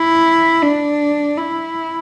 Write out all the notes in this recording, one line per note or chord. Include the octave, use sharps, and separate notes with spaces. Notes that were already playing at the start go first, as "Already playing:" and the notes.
Already playing: E4
D4
E4